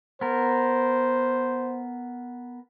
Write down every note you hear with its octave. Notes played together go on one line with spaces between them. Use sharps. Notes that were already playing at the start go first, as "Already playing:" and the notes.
B3 A#4 C5